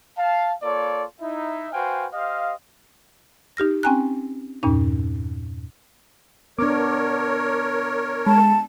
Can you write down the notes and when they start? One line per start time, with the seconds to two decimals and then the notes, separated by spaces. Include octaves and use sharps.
0.17 F5 A5
0.63 A#3 F4 A4 C#5 D5
1.21 D#4 E4 E5
1.73 F#4 B4 C5 F5 G5 G#5
2.14 G4 C5 D#5 F5
3.57 D#4 G4 F6 A#6
3.83 C4 C#4 G5 G#5 A#5 F#6
4.63 E2 G2 A#2 C#4 D#4
6.59 B3 D4 A#4 C#5 D6
8.27 G#3 A5 B5